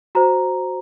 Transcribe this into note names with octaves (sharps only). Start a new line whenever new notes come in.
F#4 C5 A#5